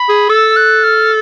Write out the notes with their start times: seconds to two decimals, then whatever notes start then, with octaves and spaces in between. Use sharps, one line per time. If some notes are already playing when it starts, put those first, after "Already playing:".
Already playing: B5
0.09 G#4
0.30 A4 E6
0.56 F#6
0.84 F6